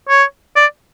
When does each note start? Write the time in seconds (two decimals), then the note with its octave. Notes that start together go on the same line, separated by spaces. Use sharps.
0.09 C#5
0.56 D5